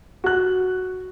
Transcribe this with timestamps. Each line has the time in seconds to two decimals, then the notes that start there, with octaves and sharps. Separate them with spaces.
0.24 F#4 F#6